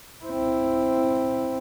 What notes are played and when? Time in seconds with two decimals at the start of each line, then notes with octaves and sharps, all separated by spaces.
0.25 C4 E4